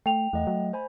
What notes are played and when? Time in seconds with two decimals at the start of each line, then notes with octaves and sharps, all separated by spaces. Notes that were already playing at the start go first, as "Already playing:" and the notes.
0.06 A3 G5 F7
0.33 E2 A3 D#5 F#5
0.47 F#3
0.73 C5 G#5 B5